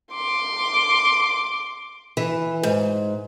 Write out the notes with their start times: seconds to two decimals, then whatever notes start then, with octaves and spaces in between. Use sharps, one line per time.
0.12 C6 D6
2.17 E3
2.63 G#2